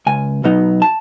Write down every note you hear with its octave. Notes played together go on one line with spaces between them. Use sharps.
C#2 G#5
B2 F#3 B3 D#4
A5